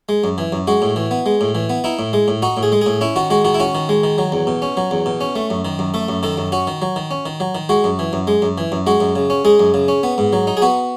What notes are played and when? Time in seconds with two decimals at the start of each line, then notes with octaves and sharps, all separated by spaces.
0.09 G#3
0.24 F#2
0.38 E3
0.52 F#2
0.67 G#3 F#4
0.82 A2
0.96 E3
1.11 B3
1.26 G#3
1.41 A2
1.55 E3
1.70 B3
1.84 D#4 E4
1.99 A2
2.13 G#3
2.28 A2
2.42 D#4 F#4
2.57 A2
2.63 G#4
2.72 G#3
2.81 A2 G#4
3.01 C#4 E4
3.16 D#3 F#4
3.30 G#3 F#4
3.45 D#3 F#4
3.54 E4
3.60 C#4 F#4
3.75 D#3
3.89 G#3
4.04 D#3
4.18 F#3
4.32 E2
4.47 B2
4.62 C#4
4.77 F#3
4.91 E2
5.06 B2
5.21 C#4
5.36 A3
5.50 F#2
5.65 D#3
5.79 F#2
5.94 A3 A4
6.09 F#2
6.23 D#3 A4
6.38 F#2
6.52 C#4 F#4
6.67 D#3
6.82 F#3
6.96 D#3
7.11 C#4
7.26 D#3
7.40 F#3
7.55 D#3
7.69 G#3 F#4
7.84 F#2
7.99 E3
8.13 F#2
8.27 G#3
8.42 F#2
8.58 E3
8.72 F#2
8.87 G#3 F#4
9.00 F#2
9.16 C#3
9.30 C#4
9.45 G#3 G#4
9.60 F#2
9.74 C#3
9.88 C#4
10.03 B3
10.18 G#2
10.33 F#3
10.47 D#4
10.57 G#4
10.62 B3 F#4